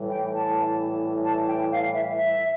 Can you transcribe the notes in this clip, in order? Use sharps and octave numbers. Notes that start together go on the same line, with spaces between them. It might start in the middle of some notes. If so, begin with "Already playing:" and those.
Already playing: A2 E3 G3
G5
A5
A5
G5
F5
E5
E5